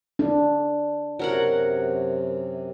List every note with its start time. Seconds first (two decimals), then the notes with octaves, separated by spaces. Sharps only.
0.19 D4
1.19 F#2 C3 F#3 A#4 F#5